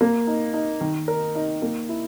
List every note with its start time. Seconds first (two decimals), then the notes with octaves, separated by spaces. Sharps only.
0.01 A#3
0.27 D#4
0.54 D#4
0.81 D#3
1.08 A#4
1.35 D#4
1.62 A#3
1.89 E4